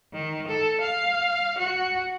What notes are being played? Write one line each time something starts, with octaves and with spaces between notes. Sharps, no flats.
D#3
A4
F5
F#4